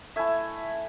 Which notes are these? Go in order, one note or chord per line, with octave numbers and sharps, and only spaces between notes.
A3 E4 E5 G#5